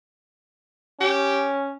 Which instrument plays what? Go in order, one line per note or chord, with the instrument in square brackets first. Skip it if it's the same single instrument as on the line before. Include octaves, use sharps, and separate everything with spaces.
[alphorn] C#4 [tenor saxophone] G4